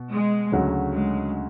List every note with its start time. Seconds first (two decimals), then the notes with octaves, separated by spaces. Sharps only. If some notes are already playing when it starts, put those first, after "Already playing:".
Already playing: B2
0.12 G#3
0.52 D2 C#3 F#3
0.93 G#3